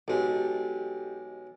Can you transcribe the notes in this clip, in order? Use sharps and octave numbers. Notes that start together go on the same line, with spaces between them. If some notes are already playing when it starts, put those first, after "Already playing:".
B1 G#3 G4 A4